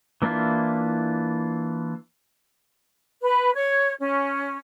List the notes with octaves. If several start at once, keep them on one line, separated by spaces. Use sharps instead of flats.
E3 A#3 D4 E4 F4
B4
C#5
C#4